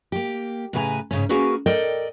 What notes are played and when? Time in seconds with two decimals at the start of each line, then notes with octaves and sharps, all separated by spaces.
0.12 A#3 G4
0.73 A2 C#3 B4 F5 G#5 A#5
1.11 G#2 C#3 C#4
1.29 A#3 C#4 F#4 G#4 A#4 B4
1.66 A4 A#4 D5 D#5 G5